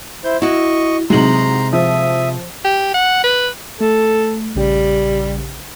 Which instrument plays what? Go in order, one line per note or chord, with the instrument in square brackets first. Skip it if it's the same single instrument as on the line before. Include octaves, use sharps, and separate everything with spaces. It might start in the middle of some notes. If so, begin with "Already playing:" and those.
[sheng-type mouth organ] E4 C5 G6
[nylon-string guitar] E4 F#4 [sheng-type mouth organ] D#5 C#6
[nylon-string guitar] C3 G#3 [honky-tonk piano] F#3 D#4 F#7 [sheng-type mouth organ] A#5 C6
[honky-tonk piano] F3 [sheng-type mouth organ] E5 D#6
[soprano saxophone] G4
F#5
B4
[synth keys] A3 [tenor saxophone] A4
[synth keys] A#1 C#3 G4 [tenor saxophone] G3